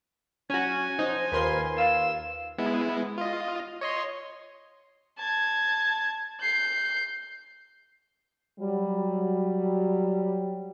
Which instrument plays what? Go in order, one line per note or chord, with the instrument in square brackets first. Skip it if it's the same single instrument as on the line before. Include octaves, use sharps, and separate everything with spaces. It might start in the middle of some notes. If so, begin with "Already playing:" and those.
[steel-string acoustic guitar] F#3 [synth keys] C#4 F#4 [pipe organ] G#5
[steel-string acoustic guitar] F3 [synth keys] D#4 [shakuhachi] C5
[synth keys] D#2 C6 [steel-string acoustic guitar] F4 A#4 B4
[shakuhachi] F5 [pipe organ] E6
[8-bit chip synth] G#3 B3 E4
F4 D#5
C#5 D#5 C6
[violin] A5 G#6
G6 C7
[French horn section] F#3 G3